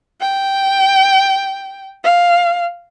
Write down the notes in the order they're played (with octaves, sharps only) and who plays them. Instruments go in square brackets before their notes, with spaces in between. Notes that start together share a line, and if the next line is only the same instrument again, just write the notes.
[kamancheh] G5
F5